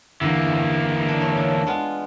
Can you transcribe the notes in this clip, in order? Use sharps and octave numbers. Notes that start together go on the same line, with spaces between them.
E2 D3 E3 A#3
D4
A3 C#5
D4
G#3 B3 F4